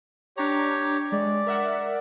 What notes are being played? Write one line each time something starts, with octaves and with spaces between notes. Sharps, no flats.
D4 G4 C#5 A#5
G#3 D5
A#4 E5 F#5